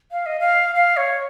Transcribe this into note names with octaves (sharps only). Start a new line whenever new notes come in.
F5
D#5
F5
F5
C#5